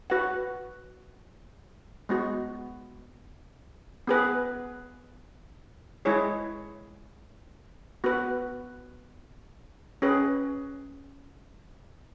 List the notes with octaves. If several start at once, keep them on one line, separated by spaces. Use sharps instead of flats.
F#4 B4 F#5
G#3 B3 F#4
B3 G#4 B4
G#3 E4 G#4 C#5
B3 F#4 B4
C#4 G#4 B4